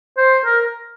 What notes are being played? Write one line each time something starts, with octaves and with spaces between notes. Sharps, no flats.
C5
A#4